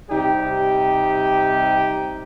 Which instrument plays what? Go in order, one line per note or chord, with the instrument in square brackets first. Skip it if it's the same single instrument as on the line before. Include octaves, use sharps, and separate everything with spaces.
[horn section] C3 G3 D#4 G4